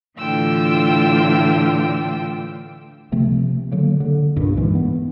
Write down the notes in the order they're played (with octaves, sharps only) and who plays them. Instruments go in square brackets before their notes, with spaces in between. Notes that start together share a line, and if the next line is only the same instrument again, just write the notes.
[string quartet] A2 D3 E3 F4 G5 E6
[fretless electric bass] C3 F3 A3 C4
D3 F#3 A#3
D3
C2 G2 A#2
G#2 E3 G#3
B3